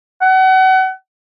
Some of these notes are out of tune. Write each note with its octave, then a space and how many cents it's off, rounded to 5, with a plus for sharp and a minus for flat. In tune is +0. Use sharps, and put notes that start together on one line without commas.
F#5 +30